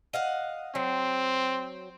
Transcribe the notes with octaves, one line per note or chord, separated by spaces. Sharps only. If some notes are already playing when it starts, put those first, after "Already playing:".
D#5 F5 F#5
F#3 C4